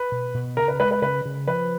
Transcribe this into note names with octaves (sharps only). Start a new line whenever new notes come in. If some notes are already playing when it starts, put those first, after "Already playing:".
Already playing: B4
B2
B2
C#3 A#4
B4
G#3 B4
B4
C#3 B4
C#3
F3 B4